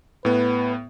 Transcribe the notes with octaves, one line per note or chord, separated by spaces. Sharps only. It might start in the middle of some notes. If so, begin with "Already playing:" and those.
A2 B3 B4